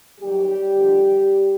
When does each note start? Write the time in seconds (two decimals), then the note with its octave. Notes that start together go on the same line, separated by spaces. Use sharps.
0.20 D#2 D#3 F#3 G3 G4
0.75 D#2 D3 F3